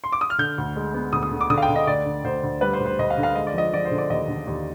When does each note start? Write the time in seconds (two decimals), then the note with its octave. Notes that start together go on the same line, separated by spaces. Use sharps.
0.04 C6
0.12 D6
0.21 D#6
0.30 F6
0.38 D3 G6
0.58 D2
0.76 G#3
0.94 B3
1.12 D2 D#6
1.23 D#6
1.32 D3
1.41 D6
1.50 D3 D#6
1.58 F5
1.62 G5
1.69 D3
1.76 D#5
1.87 D2 D5
2.06 D3
2.24 D2 C5
2.43 D2
2.61 G3 B4
2.73 C5
2.80 D2
2.86 C5
2.99 D2 D#5
3.10 F5
3.18 D3
3.23 F5
3.35 G#3 D#5
3.47 D5
3.54 F3 D#5
3.73 F3 D5
3.85 C5
3.91 D3
3.98 D5
4.10 D#2 D#5
4.28 D3
4.47 D#2